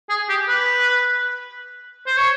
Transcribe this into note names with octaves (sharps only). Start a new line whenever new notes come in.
G#4
G4
B4
C5
C#5